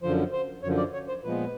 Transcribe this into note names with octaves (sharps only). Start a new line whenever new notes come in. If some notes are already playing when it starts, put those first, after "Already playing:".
F#2 D3 F3 C5
C5
F#2 D3 F3 C#5
D5
C#5
C5
A#2 F3 G#3 B3 B4